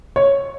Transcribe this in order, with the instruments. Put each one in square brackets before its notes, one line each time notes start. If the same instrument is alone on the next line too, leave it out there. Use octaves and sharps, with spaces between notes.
[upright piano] C#5